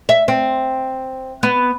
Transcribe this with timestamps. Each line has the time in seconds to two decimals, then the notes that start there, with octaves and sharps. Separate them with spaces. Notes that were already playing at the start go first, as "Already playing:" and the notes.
0.09 E5
0.28 C4
1.43 B3